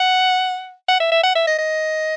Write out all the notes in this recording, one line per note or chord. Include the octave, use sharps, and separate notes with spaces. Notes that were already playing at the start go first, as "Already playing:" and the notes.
Already playing: F#5
F#5
E5
E5
F#5
E5
D#5
D#5